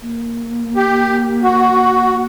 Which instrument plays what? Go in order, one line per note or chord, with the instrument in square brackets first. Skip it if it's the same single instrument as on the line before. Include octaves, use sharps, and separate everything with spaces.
[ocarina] A#3
[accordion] G4
F#4